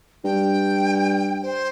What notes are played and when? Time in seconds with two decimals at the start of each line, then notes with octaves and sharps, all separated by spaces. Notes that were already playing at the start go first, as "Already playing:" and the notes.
0.24 G2 G5
1.43 C5